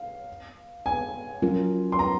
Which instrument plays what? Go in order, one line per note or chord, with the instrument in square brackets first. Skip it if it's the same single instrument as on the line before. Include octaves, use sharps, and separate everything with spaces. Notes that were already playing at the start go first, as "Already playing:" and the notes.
Already playing: [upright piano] F5
G#5
[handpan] F#3 C#4 F4 A#4
[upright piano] C6
A#5